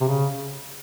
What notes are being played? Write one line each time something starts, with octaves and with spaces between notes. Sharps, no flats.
C3
C#3